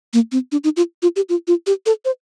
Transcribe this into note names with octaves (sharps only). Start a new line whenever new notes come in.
A#3
C4
D4
D#4
F4
F4
G4
F4
F4
G4
A4
C5